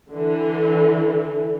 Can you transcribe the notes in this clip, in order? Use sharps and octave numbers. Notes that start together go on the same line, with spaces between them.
D3 E3